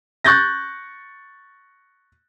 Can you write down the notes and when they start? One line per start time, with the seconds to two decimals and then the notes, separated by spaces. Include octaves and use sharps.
0.24 C#6 F#6 G6 A6 A#6